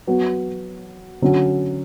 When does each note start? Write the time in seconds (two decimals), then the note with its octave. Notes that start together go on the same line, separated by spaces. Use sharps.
0.07 F#3 B3 F#4
1.22 D3 F#3 C#4 F#4